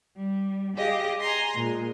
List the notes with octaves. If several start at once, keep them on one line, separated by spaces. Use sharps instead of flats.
G3
G4 G#4 D#5 F5
G#5 A#5 C6
A#2 G#3